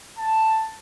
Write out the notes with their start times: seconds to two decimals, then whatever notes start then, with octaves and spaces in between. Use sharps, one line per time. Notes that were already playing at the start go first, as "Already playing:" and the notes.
0.18 A5